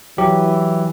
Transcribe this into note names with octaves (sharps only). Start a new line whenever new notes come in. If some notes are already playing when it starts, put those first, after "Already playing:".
E3 F#3 G4